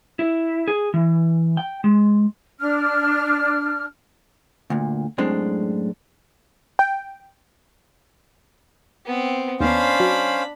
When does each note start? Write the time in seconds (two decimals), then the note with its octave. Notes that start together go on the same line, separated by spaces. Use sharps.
0.19 E4
0.68 G#4
0.94 E3
1.57 G5
1.84 G#3
2.59 D4 F6
4.70 D2 A#2
5.18 F#2 A2 G#3 C4 D4
6.79 G5
9.06 B3 C4
9.60 D#2 B3 C#4 D4 C5 F5 B5
10.00 F#3